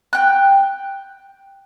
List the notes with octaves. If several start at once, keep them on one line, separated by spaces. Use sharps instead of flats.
G5 F#6